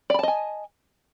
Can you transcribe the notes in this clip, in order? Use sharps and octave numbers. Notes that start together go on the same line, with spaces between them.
D5 D#5 G#5 A5 B5